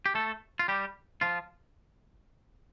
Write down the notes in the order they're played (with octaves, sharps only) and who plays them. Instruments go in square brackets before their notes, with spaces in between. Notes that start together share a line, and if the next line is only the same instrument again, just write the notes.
[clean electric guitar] G4
A3 A4
F4
G3 G4
F3 F4